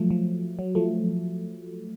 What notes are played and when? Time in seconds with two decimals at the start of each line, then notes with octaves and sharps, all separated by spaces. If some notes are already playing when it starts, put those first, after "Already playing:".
Already playing: F3 F#3 A3
0.11 F3
0.59 F#3
0.75 F3 A3